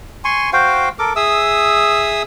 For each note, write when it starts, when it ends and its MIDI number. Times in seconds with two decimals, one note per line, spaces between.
0.24 0.50 80
0.24 0.50 84
0.24 0.50 85
0.53 0.89 66
0.53 0.89 72
0.53 0.89 77
0.53 0.89 79
0.99 1.13 69
0.99 1.13 70
0.99 1.13 86
1.16 2.22 68
1.16 2.22 76
1.16 2.22 87
1.16 2.22 88